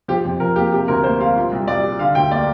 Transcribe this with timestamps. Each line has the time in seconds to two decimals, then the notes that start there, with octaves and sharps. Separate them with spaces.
0.08 F3 G4
0.25 F2
0.40 F2 A#4
0.56 A#3 G4
0.72 C3 G4
0.88 D2 A#4
1.04 A#3 C5
1.20 G3 F5
1.36 A#2
1.52 C2
1.68 C2 D5
1.83 G3
1.99 D3 F5
2.15 D2 G5
2.31 A#3 D5